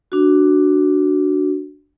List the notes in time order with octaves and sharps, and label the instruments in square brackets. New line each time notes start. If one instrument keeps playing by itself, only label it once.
[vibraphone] D4 F#4